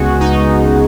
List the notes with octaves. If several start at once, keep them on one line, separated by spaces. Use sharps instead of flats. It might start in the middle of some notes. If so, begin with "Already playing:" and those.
Already playing: C#2 C#3 G#3 B3 F#4 G#4
D#4